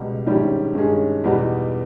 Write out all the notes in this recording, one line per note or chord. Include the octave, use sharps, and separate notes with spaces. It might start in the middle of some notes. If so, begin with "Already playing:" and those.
Already playing: C#2 B2 G3
A#1 G#2 D#3 G3 C#4
G2 D#3 G#3 C#4 G#4
E2 B2 G3 B3 D#4